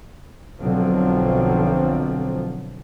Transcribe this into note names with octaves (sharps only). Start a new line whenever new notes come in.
B1 D3 F3 F#3 C4